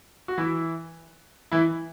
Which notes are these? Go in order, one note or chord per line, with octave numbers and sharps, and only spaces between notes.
F#4
E3 E4
E3 E4